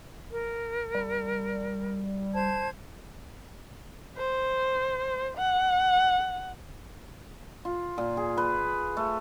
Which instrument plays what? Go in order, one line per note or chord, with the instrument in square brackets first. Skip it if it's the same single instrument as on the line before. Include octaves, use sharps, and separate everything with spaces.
[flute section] A#4
[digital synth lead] G3
[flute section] C5 A5 G#6
[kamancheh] C5
F#5
[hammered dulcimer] F4
A#2
G#4
B4
A3